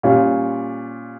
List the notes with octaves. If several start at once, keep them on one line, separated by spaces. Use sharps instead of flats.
A#2 G3 C#4 F4